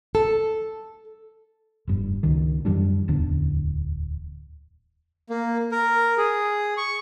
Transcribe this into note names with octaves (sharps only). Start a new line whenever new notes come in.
A4
F1 G2
C#2 D#3
F#2 E3 G3 D4
D1 E2 D3 D4
A#3
A#4
G#4
C#6